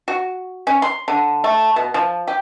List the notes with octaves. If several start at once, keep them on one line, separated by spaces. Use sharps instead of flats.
F#4
C#4
C6
D3
A3
B2
F3
G4